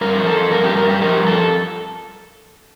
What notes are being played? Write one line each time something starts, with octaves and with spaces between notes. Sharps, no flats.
G2 A#4
F3
A4
F3
G2 A#4
G2 G4
A#4
G2 G4
F3 A#4
G2
A4